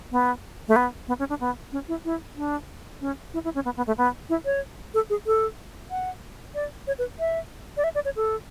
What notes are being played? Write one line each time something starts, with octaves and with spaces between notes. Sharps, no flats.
B3
A3
B3
B3
C#4
D4
B3
C#4
E4
E4
D4
C#4
E4
E4
C#4
B3
B3
A3
B3
E4
C#5
A4
G#4
A4
F#5
D5
C#5
B4
E5
D5
E5
D5
C#5
A4